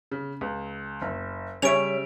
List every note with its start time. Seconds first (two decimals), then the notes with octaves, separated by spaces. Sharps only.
0.11 C#3
0.41 C#2
1.02 F#1
1.62 C#3 G3 C#4 E5 D7 F7